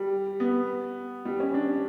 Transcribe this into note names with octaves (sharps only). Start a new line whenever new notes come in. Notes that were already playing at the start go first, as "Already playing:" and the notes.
Already playing: G3
B3
G3
C#4
D4